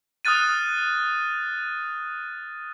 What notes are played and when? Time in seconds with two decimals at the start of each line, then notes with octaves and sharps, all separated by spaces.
0.25 D#6 F6 F#6 A6 D#7